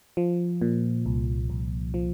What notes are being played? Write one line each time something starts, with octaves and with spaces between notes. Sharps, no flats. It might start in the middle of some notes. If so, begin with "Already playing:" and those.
F3
A#2
C2
C2
F3